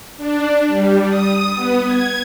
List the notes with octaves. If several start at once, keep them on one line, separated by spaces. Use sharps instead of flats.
D4
G3
D#6
B3
G#6